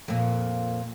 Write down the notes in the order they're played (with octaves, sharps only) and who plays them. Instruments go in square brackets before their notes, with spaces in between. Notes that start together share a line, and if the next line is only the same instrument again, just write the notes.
[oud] F2 A#2